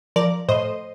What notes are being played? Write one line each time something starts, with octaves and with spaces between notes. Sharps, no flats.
F3 A#4 D5
A2 C5 D#5